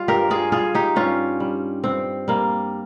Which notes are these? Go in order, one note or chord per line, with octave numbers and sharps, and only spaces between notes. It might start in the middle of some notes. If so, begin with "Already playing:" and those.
Already playing: G3 F4
G2 G4 A#4
F4 G#4
G3 F4 G#4
D#4 G4
G2 C#4 F4
G3
G2 C4
G3 A#3